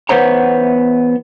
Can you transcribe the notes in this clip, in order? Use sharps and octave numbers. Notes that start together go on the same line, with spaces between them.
E2 G2 B3 C5 C#5 A#5